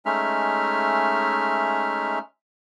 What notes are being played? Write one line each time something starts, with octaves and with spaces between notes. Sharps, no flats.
G#3 A3 C#4 D#4 E5 F6